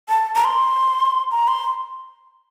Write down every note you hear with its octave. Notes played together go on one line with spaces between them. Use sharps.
A5
A#5
C6
A#5
C6